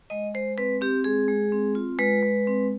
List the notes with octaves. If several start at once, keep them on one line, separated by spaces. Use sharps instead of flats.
G#3 D#5
G#3 C5
C4 B4
C4 G4
G#3 G#4
G#3
C4
F4
G#3 B4
G#3
C4